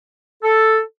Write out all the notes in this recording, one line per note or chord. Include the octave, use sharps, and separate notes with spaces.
A4